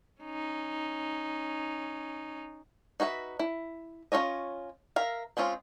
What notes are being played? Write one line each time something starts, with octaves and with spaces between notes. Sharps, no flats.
C#4 D#4
D#4 F#4 B4 E5
E4
C#4 D#4 F4 C#5 D#5
A#4 E5 F5
G#3 C4 C#4 F4